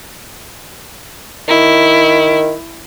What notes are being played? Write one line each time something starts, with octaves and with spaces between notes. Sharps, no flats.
D#3 E4